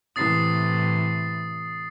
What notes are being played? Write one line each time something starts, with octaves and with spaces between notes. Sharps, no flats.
A2 C3 E3 D#6 A6 C7